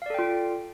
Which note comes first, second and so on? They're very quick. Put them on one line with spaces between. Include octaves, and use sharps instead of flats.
F5 D5 A4 G5 F4